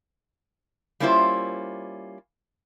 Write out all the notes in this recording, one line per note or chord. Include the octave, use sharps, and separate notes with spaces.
G3 A#3 C#4 E4 F4 C5